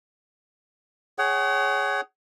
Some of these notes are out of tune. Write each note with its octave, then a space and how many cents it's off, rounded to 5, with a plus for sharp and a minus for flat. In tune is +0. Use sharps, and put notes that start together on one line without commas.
G#4 +0 C#5 +0 F#5 +35